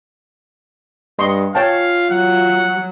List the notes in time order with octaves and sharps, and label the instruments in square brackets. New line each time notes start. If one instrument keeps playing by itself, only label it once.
[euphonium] G2 [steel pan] D#5 C6 C#6
[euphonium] F4 [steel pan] C#5 G5 A5 [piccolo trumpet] F5
[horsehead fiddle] F#3 [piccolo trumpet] F#5